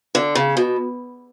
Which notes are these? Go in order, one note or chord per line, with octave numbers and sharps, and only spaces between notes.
D3
C#3
B2